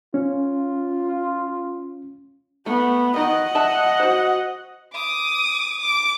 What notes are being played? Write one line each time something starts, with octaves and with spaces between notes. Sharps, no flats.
C#4 F4
A3 B3
D#3 D#5 F#5
E5 A5
F#4 C5
D6 D#6
D6